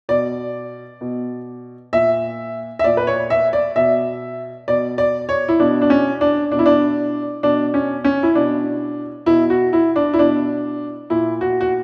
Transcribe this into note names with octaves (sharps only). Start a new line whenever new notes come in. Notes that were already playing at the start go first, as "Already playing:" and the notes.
B2 D5
B2
A#2 E5
E5
A#2 D5
B4
C#5
E5
D5
B2 E5
B2 D5
D5
C#5
E4
B2 D4
D4
C#4
D4
B2 D4
E4
D4
B2 D4
C#4
C#4
E4
B2 D4
B2 E4
F#4
E4
D4
E4
B2 D4
A#2 E4
F#4
F#4